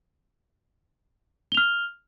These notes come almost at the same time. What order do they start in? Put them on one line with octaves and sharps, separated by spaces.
G7 F7 F6